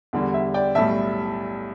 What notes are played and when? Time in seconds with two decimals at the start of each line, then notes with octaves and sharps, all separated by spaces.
0.13 E2 D3 G3
0.34 E5
0.54 D5 G5
0.75 B1 A2 G3 E5 A5